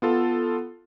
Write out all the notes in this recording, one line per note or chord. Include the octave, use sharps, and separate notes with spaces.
B3 F4 A4